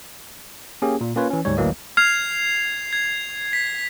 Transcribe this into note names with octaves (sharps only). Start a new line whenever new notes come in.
A#3 C#4 G4 G#4
A#2
A#3 C#4 F4 B4 C#5
E3 C#4
D2 G#2 G3 C#5
A1 D2 E3 F#3 A#3 D#5
F6 G#6 C7 F7
G#6
B6